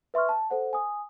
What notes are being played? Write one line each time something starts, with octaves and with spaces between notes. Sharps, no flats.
B4 E5 C6 C#6 F6
A5
A4 C5 F#5
G#5 D#6